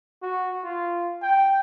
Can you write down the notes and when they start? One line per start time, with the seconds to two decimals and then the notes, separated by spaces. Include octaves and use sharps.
0.22 F#4
0.64 F4
1.23 G5